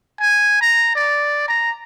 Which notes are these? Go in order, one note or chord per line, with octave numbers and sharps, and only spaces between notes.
G#5
A#5
D5
A#5